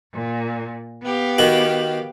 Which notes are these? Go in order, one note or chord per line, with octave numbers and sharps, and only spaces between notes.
A#2
B3 G4 F5
D#3 F#4